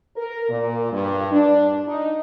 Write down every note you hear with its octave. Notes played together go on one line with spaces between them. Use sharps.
A#4
A#2
G2
D4
D#4